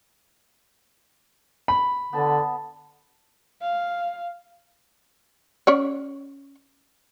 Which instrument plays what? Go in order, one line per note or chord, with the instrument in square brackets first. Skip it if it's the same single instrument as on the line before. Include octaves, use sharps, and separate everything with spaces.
[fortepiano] B5
[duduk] D3 [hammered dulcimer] B3 A5
[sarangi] F5
[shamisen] C#4 C#5 D5